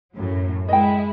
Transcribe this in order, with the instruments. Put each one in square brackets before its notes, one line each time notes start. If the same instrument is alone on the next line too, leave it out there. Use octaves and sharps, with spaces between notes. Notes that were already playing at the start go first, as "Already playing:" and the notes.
[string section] F#2 A2 F#3
[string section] G#3 E4 [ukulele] D#5 G5